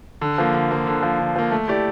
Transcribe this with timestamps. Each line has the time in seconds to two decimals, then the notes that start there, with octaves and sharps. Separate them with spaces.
0.21 D3
0.38 F3 A#3
0.54 D3
0.71 F3 A#3
0.87 D3
1.03 F3 A#3
1.19 D3
1.36 F3 A#3
1.51 A3
1.68 E4 G4 D5